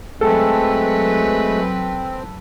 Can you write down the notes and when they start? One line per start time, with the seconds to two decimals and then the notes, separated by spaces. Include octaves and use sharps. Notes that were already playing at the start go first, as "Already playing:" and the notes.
0.21 F#3 G#3 A3 C4 A4 B4